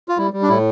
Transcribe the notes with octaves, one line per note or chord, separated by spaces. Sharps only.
F4
G3 E4
G3
D4
A2 E4